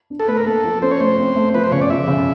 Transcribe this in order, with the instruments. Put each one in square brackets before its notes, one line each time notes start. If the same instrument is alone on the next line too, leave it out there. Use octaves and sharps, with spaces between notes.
[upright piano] D4
[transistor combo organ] A4
[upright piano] A3 [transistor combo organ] B4
[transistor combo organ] A#4
[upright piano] A#3 [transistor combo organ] A4
[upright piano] F3
[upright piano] C#4 [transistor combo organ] C5
[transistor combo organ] C#5
[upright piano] A3 [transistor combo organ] C5
[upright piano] C4
A3
[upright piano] F3 [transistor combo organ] B4
[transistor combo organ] C5
[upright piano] C#3 [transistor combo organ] C#5
[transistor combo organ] D5
[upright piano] F3 [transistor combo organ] E5
[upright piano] C#3